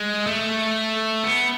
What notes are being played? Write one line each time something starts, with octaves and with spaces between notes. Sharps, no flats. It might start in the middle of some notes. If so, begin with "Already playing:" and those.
Already playing: G#3
A3
B3